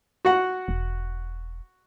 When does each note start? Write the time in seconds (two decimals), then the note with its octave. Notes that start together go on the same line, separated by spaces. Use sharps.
0.25 F#4 F#5
0.68 E1